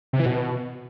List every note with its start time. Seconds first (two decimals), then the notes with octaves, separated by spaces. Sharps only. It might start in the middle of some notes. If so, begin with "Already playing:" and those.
0.13 C3
0.20 E3
0.26 B2